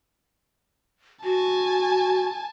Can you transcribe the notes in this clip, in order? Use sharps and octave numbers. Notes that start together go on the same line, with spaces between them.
F#4 G#5 A5